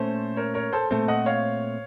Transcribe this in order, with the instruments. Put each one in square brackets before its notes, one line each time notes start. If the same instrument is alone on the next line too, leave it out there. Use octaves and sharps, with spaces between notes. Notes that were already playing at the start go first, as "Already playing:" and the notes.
Already playing: [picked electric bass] A#2 A3 C#4 [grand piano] A4 C5
[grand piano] A#4 C#5
A#4 C#5
A4 C5
[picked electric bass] A#2 A3 C4 [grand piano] A4 C5
[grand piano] D#5 F#5
C#5 F5